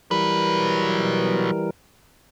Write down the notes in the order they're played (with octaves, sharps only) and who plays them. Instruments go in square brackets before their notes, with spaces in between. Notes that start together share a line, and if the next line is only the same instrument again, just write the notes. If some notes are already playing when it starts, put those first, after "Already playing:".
[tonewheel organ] E3 G3 A#4 [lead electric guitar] F#3 B4